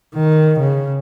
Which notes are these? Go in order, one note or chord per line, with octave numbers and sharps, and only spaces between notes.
D#3
C#3